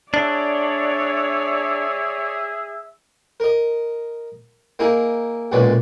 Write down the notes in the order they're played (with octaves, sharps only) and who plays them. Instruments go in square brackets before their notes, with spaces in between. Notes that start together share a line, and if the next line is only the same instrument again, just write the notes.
[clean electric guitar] D4 [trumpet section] G#4 E5 [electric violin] C#5 D5
[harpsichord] A#4 D#5
A#3 D#4 E4 G#4
B1 F#2 A#2 G#3 B4 D5